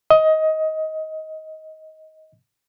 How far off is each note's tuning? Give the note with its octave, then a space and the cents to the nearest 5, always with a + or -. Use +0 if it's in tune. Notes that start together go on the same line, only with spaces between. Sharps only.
D#5 +20